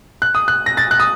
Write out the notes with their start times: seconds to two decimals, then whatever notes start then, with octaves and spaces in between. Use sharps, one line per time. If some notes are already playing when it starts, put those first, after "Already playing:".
0.22 F#6
0.35 D#6
0.48 F#6
0.66 A#6
0.77 A6
0.91 F#6
1.00 D#6